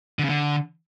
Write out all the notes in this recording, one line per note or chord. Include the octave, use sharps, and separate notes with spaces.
D3
C#3
D3